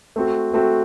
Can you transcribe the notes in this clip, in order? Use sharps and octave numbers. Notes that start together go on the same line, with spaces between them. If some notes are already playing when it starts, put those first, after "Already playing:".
A3 C4 F#4
A3 C4 F#4